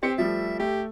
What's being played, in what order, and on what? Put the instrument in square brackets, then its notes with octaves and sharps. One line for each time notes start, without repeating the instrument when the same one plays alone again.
[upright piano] C4 C#7 [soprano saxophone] G4
[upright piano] F3 G3 A3 [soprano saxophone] E5
[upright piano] A3 [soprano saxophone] G4